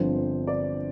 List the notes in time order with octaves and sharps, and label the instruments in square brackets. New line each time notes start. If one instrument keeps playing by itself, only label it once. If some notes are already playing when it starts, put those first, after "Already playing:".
Already playing: [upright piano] G1 G2 F3 C4 C5
D5